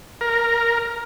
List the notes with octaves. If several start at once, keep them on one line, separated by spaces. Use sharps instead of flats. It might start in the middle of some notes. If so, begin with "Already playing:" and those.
A#4